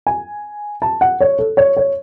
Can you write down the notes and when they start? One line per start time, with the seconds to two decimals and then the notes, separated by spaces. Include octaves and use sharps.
0.07 G#5
0.82 A5
1.01 F#5
1.21 C#5
1.39 A4
1.57 C#5
1.77 C#5